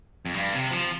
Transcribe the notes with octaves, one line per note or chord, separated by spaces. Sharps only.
F2
G2
C3
F3